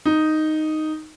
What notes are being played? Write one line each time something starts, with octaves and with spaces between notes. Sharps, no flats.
D#4